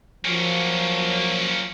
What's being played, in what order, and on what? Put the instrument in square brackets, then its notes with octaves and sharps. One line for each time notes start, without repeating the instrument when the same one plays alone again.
[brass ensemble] F3 F#3 [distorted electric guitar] A#3 C#4